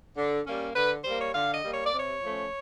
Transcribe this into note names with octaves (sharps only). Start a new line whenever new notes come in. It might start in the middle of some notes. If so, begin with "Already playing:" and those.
D3
G3 A#3 C#4
D3 B4
G3 A#3 C5
C#5
D3 F5
D#5
G3 A#3
C#5
D5
C3
C#5
F3 A3 C#4